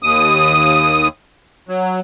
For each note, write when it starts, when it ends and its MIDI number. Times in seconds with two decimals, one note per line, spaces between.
0.03 1.08 39
0.03 1.08 87
1.69 2.00 54